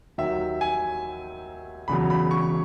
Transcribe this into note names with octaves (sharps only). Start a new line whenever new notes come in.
D#2 D#3 F#3 E5
G#5
E1 E2 C#3 F#3 B5
B5
C#6